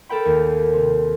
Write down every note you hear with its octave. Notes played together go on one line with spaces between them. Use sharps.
A4 A#4 G5 B5
D#2
C3